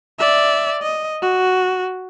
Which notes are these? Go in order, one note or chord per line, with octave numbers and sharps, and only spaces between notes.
D5 E5
D#5
F#4